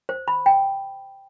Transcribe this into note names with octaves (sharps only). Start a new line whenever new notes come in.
C5
B5
G5